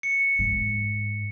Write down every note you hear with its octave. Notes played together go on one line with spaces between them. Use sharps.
C#7
G#2